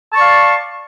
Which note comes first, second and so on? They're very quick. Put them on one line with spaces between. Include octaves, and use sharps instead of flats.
A5 C#6 D5 F5